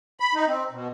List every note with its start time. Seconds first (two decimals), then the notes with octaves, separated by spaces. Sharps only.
0.20 B5
0.35 D#4
0.48 C4
0.71 B2